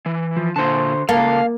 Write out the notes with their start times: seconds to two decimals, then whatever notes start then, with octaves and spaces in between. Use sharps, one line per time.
0.06 E3
0.37 F3
0.56 A#2 D3 C5 A5
1.09 C#2 A#3 A4 F5